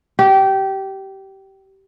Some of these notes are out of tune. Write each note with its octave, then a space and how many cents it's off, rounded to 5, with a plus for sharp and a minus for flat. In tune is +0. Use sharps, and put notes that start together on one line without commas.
G4 -20